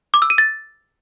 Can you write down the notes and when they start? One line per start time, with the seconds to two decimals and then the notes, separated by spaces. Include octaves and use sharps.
0.14 D6
0.22 E6
0.30 D#7
0.38 A6